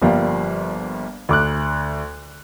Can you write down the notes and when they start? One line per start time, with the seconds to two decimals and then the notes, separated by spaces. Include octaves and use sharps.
0.02 G1 F3 G3 A#3
1.29 D2 D6 F#6